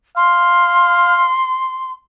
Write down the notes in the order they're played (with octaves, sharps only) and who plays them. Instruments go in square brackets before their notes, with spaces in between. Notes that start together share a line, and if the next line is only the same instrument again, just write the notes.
[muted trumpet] F5 [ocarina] C6